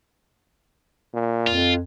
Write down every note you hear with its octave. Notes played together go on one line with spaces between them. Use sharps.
A#2
F2 F4